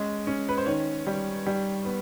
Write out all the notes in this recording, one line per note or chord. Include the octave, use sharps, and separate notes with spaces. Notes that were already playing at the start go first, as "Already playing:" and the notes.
Already playing: G#3 C#4 D#5
C#4
B4
C5
D#3 C#5
G3
G3
B3